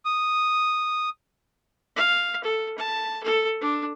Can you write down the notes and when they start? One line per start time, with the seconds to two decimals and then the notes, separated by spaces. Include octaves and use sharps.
0.05 D#6
1.96 F5
2.44 A4
2.78 A5
3.23 A4
3.61 D4